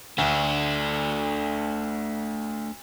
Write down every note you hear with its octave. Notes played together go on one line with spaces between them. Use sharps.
D2 A3 D4